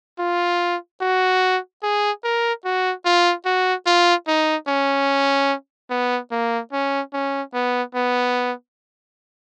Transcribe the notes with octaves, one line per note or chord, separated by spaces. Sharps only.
F4
F#4
G#4
A#4
F#4
F4
F#4
F4
D#4
C#4
B3
A#3
C#4
C#4
B3
B3